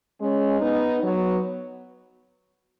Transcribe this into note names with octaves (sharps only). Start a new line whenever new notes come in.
G#3 C#4
B3 D#4
F#3 B3